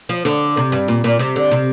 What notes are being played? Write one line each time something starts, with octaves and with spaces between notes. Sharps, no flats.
F3
D3
C3
G2
A#2
A#2
C3
D3
C3